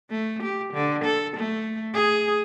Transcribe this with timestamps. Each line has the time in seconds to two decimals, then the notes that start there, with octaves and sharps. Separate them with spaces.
0.10 A3
0.43 G4
0.73 D3
1.04 A4
1.36 A3
1.94 G#4